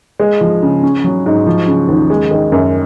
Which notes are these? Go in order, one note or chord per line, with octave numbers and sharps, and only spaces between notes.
G#3
F3
C#3
C#4
F#3
G#2
F3
C#3
D#2
G#3
D#3
F#2